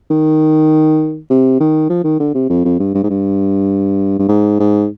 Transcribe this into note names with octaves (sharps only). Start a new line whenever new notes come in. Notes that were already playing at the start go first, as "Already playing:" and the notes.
D#3
C3
D#3
F3
D#3
D3
C3
F2
F2
G2
G2
G#2
G2
G2
G#2
G#2